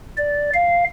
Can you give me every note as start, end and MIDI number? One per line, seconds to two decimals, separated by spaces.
0.17 0.50 74
0.54 0.84 77